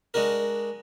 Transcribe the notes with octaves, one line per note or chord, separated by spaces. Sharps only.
G#3 D4 F#4 A#4